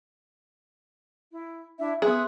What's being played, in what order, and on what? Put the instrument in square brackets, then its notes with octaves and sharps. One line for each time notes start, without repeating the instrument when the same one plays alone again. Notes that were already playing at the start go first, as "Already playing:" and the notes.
[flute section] E4
D4 E4 E5
[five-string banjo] B3 G#4 [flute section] E5 C6 F#6